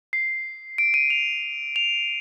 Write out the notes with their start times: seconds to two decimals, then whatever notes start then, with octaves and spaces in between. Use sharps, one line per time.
0.13 C7
0.78 D7
0.94 D#7
1.10 F7
1.76 F7